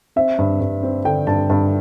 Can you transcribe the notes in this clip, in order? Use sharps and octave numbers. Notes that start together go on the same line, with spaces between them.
C4 E5
G2
G2
C4
D3 G5
G2 A5
G2 A5